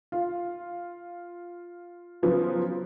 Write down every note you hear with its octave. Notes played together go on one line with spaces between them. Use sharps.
F4
C#3 F3 F#3 B3